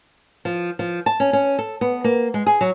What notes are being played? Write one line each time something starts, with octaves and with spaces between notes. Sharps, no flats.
F3
F3
A5
C#4
C#4
A4
B3
A#3
G#3
G#4
F#3